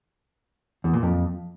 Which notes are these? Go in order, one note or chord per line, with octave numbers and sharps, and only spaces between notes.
E2
A#2
F2